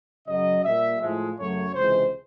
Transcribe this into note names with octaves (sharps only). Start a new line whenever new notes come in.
F#2 C#3 F#3 D#5
A#2 G3 A#3 E5
A2 F3 G#3
F#2 C#3 F#3 A3 C#5
C#2 C3 E3 G#3 C5